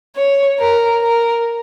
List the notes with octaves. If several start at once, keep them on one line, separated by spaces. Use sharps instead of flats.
C#5
A#4
A#4